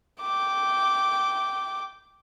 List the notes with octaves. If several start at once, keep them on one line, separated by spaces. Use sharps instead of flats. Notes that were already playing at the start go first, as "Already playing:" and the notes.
G5 D6